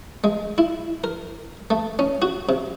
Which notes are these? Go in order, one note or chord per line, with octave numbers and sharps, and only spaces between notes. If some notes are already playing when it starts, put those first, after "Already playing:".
G#3
E4
A#4
A3
C#4
F#4
C3